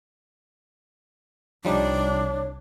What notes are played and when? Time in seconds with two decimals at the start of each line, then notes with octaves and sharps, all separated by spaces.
1.65 C2 F3 G3 D4 D#4 C#5